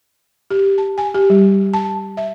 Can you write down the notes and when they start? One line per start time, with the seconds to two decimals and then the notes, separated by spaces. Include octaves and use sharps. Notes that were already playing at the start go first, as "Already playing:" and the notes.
0.51 G4
0.78 A5
0.98 G#5
1.14 G4
1.30 G3
1.74 A5
2.17 E5